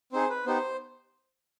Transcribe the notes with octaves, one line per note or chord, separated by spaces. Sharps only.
C4 D#4 G#4 C5
B4
B3 D#4 G4 C5